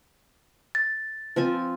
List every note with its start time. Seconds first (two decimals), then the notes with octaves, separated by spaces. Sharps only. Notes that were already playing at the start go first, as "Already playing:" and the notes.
0.75 A6
1.36 F3 C4 G#5